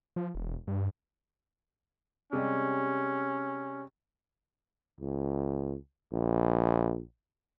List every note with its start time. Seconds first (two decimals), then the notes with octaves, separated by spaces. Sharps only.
0.16 F3
0.35 E1
0.67 G2
2.33 C3 G3 G#3 C#4
5.00 C#2
6.12 A#1